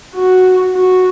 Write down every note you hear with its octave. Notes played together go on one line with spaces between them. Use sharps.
F#4
F#4